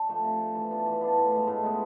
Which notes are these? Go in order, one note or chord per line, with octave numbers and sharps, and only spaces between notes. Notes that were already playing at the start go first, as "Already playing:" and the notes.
Already playing: D4
F3 A3
C3
F3 A3
E3
B3 D4 F4
E3
B3 D4 F4
A2
G#3 B3
A2
G#3 B3